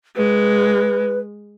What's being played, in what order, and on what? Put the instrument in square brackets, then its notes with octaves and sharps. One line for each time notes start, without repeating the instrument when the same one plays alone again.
[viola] G#3 [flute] B4